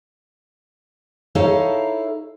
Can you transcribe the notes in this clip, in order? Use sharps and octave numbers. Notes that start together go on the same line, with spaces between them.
D#4 E4 A4 A#4 C#5 F5